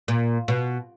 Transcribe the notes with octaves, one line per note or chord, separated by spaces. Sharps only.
A#2
B2